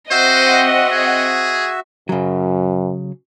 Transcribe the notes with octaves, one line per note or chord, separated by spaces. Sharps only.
C4 F#4 C5 D#5 E5 F#5
G#4
F#2 C#3 F#3